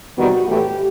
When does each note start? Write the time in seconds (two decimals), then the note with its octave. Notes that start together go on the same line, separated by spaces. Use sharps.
0.17 E2 C3 D#3 G3 B3 F#4
0.48 A2 E3 A3 G4